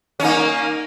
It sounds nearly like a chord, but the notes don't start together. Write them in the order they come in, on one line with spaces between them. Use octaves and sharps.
C#4 D#4 A#3